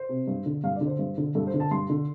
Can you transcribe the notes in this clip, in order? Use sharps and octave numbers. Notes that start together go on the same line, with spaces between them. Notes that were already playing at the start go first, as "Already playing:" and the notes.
Already playing: C5
C3
G2
D3
G2 F5
D5
D3
C5
G2
D3
G2 A4
C5
D3
A5
G2 C6
D3